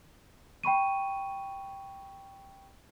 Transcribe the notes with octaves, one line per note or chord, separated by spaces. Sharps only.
G5 B5 C#6 D#7